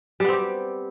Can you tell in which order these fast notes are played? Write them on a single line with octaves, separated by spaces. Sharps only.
G3 B3 C4 G4